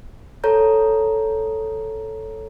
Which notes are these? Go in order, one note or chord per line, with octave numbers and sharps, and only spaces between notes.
A4 C#5 A#5 G6